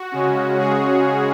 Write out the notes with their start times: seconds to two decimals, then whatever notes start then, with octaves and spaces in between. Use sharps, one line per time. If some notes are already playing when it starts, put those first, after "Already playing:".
Already playing: F#4
0.12 C#3 G#3 C#4
0.59 G#4